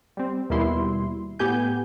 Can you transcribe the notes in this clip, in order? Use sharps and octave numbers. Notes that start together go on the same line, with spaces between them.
G3 C4
D#2 B2 G3 E4 C6
A2 B3 G4 G#5 G6